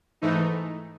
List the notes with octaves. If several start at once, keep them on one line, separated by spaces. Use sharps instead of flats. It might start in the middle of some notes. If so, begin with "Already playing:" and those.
G#2 E3 A3 D#4